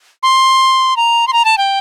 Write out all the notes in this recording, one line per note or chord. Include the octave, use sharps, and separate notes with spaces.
C6
A#5
C6
A#5
A5
G5